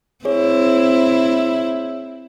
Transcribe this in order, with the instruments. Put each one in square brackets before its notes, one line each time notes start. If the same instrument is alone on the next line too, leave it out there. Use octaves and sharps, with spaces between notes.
[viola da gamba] C4 E4 [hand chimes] G#4 C#5